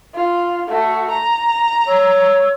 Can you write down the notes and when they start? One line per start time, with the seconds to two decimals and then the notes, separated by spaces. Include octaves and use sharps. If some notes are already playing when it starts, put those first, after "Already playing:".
0.15 F4
0.69 A3 F#4
1.11 A#5
1.88 C#5 C#6 E6